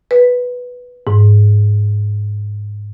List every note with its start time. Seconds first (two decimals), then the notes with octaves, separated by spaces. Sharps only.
0.11 B4
1.07 G#2